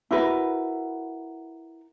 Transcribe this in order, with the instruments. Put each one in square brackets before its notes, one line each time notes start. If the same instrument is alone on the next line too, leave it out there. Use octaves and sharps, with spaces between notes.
[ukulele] E4 F#4 A#4 B4